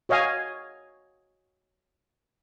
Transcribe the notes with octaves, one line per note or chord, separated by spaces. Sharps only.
F#4 C#5 D#5 F5 G#5